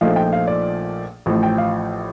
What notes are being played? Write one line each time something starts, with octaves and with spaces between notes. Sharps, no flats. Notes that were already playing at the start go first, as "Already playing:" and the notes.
A#1 A#2 F3 A3 D#4 F5
G5
F5
D5
A1 A2 F3
G5
F5